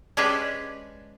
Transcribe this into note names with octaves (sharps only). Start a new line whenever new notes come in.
G#3 C#4 D4 G4 B4 D5